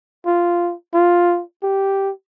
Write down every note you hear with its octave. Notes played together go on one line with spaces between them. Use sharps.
F4
F4
G4